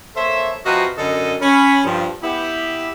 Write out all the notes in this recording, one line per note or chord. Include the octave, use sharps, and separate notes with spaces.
A#3 A4 C5 C#5 E5
C3 F3 F#4 B4 D#5 F5
F#2 D3 A4 D#5
C#4 B5
G2 F3
B3 E4 G4